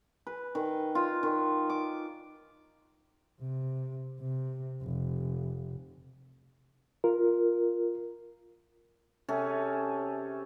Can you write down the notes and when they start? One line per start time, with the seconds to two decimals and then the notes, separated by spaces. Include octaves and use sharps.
0.27 B4
0.55 D#3
0.95 F4
1.23 D#3
1.70 D6
3.40 C3
4.20 C3
4.83 F1
7.04 F4 A#4
9.28 C3 C#4 G#4 A4